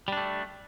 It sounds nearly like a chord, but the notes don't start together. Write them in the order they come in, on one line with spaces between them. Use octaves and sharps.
G3 D4 A3